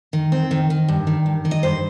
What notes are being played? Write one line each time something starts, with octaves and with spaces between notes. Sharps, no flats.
D#3
C4
D#3
D#3
G2
D#3
G2
D#3
D#5
G2 C5